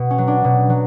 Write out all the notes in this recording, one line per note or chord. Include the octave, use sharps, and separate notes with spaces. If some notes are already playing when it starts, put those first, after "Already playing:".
Already playing: B2
C#4
F#3
D4
B2
F#3